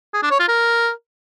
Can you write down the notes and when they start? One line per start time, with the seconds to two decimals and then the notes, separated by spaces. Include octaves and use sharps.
0.14 G#4
0.22 D4
0.31 C#5
0.40 F4
0.48 A#4